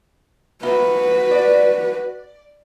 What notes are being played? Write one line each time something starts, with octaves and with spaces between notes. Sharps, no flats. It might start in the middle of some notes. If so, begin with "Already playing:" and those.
A#3 B3 F#4 B4 E5
D5